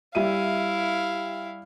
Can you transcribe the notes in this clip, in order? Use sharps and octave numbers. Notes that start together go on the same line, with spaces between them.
G3 E4 E5 F5 D#7